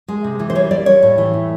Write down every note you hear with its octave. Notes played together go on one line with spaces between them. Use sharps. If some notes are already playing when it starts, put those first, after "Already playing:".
G#3
C3
E3
C5
G3 C#5
G3 D5
G3 C#5
A2
E3
A2